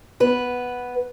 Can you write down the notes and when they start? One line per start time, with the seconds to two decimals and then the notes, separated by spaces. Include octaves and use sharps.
0.20 B3 B4